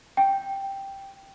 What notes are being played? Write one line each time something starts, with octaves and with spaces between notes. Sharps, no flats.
G5